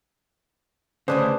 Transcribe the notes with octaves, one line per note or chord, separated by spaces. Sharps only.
D2 G2 C#3 D4 G#4 B4 C5